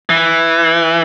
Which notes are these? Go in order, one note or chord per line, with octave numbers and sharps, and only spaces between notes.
E3